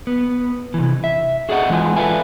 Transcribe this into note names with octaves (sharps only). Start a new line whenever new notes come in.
B3
C3 E3
E5
F#4 G#4 A4 D5 D#5 F#5
E3 G#3 F4 F#5 G#5
A4 B4 D5 E5 F5 G#5